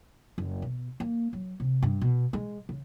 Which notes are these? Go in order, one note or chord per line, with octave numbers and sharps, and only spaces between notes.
F#1
B2
A#3
F#3
C3
G2
B2
G#3
C#3